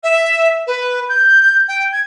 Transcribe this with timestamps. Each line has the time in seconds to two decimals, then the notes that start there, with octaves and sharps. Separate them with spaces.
0.03 E5
0.66 B4
1.09 G6
1.68 G5
1.92 G#6